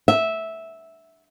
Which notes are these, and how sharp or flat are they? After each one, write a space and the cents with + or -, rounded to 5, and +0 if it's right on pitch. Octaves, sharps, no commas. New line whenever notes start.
E5 -10